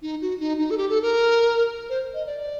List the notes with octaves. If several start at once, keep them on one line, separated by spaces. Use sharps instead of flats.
D#4
F#4
D#4
D#4
A4
G4
A4
A#4
C5
D#5
D5